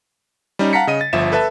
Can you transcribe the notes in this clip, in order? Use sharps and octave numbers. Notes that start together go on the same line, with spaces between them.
G3 C#4 D#4
F5 F#5 A5 A#5 B6 C#7
C#3 D#5 D#7
A6
G1 F3 E5 E7
A4 B4 E5 A5